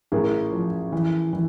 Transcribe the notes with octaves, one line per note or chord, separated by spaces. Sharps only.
A1 G#4 A#4
F3
E3
E3